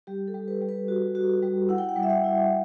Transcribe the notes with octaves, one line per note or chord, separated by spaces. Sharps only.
G3 G4
A4
G3
B4
G3
B4
F#4
F#4
G3
E4 F#5
G5
F#5
G3
E5
F#5
E4